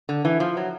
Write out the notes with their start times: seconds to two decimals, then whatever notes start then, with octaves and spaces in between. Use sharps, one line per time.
0.09 D3
0.25 E3
0.40 F3
0.57 F#3